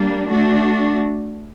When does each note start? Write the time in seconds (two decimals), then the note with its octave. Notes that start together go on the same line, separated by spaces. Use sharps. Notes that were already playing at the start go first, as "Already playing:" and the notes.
Already playing: G3 A#3 D4
0.28 A3 D4 F#4